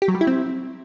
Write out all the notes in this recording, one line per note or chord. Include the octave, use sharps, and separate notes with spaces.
G4
F#3
G3
E4
C4